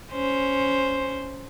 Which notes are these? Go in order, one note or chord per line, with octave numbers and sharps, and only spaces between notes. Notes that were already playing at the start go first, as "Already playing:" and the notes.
C#4 C5